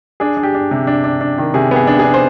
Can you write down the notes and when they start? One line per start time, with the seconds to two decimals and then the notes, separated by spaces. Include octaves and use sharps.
0.20 D4 G#4
0.37 D4
0.43 G4
0.54 D4
0.71 C3
0.87 D4
1.04 D4
1.21 D4
1.38 D#3
1.54 C3 G#4
1.71 B3 G#4
1.87 D4
1.99 G#4
2.04 D4
2.14 C5